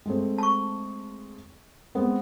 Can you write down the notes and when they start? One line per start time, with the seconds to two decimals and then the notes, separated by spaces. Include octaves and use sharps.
0.06 G#3 A3 C4
0.38 A5 C#6
1.95 G#3 B3 C4